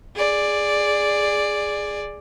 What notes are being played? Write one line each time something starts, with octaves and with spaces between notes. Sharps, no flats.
G#4 D5